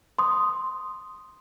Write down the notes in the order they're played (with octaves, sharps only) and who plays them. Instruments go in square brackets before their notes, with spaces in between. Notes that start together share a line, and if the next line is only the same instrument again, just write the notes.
[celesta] C6 D#6